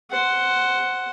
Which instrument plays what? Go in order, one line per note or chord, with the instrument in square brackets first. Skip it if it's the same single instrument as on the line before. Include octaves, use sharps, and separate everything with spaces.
[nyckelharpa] C5 F#5